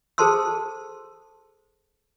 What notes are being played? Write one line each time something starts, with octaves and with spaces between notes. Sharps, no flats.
G#4 A4 C5 A5 C6 E6